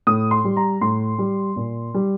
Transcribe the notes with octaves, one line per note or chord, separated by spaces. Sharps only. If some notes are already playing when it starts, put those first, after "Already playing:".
A2 D#6
C6
G3
A#5
A2 C6
G3
A#2
G3